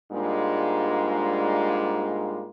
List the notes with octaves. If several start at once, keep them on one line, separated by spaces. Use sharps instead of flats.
G#2 G3 G#3 A#3 D4 F4